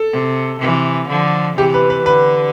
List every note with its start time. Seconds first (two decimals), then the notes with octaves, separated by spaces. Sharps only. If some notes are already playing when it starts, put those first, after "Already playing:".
Already playing: A4
0.12 C3
0.60 C3 E3
1.09 D3 F3
1.57 C3 E3 G4
1.74 B4
1.90 B4
2.06 D3 B4